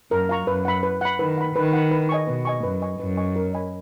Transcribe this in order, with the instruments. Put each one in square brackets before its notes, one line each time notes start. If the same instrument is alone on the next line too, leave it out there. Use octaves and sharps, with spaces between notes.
[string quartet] F#2 [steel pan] A#4
[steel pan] F5 A#5 C#6
[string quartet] F#2 [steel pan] B4
[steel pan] F#5 B5
B4
F#5 B5
[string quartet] D#3 [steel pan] B4
[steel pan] F#5 B5
[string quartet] D#3 [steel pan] B4
[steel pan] F#5 B5
B4
D#5 G#5 C#6
[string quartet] B2 [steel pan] B4
[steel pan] D#5 G#5 C#6
[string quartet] F#2 [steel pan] B4
[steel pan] D#5 G#5 C#6
[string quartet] F#2 [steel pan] B4
[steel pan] D#5 G#5 C#6
A#4
D#5 G#5 B5